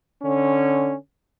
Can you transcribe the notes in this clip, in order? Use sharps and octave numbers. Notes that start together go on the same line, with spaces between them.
D3 C#4